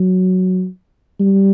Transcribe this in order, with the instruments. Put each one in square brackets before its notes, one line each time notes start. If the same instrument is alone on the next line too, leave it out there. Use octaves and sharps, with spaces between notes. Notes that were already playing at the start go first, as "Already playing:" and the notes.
Already playing: [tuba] F#3
G3